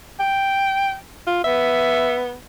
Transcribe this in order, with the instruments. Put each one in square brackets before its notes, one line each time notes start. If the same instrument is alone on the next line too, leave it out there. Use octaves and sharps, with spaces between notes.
[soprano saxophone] G5
[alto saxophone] F4
[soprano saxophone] B3 [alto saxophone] E5